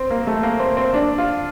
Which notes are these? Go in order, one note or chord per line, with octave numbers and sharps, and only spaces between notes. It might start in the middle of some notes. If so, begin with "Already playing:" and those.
Already playing: C4
A#3
A3
A#3
C4
C4
D4
F4